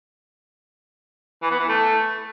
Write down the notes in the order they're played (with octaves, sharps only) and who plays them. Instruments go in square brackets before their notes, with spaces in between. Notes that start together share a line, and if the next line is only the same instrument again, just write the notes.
[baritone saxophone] E3
B3
E3
A3